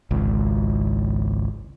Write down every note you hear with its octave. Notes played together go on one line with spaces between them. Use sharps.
G#1 C#2